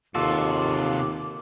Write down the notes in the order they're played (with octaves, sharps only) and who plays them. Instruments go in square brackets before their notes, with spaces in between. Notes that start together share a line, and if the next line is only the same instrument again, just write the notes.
[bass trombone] D#2 [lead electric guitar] C3 F#4 [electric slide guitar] F4 A4 [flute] D6